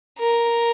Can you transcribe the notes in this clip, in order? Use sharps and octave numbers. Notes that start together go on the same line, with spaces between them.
A#4